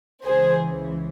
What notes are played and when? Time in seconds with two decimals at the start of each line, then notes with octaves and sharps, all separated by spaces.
0.25 C#2 C#3 E3 G#4 C5